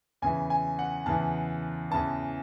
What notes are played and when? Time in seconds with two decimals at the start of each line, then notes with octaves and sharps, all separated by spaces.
0.22 E2 C#3 E3 G#5
0.50 G#5
0.79 F#5
1.06 E2 C#3 E3 A5
1.91 E2 C#3 E3 A5